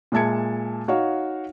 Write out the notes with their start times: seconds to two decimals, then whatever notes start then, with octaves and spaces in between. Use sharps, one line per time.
0.12 A#2 G#3 E5 A5 G#6 C#7
0.88 D#4 F#4 C#5 F5